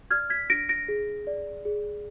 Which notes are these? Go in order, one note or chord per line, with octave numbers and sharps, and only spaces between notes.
D5 F6 G#6
G#6 B6
D4 A#6 D7
A#6 D7
G#4
D5
G#4